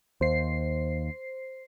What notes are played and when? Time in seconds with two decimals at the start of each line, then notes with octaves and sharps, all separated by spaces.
0.21 D#2 C5 C7